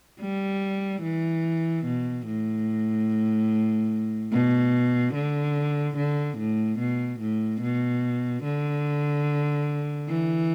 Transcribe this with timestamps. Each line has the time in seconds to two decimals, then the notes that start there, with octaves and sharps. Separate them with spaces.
0.21 G3
1.03 E3
1.85 B2
2.26 A2
4.32 B2
5.15 D3
5.97 D3
6.38 A2
6.79 B2
7.20 A2
7.61 B2
8.43 D3
10.08 E3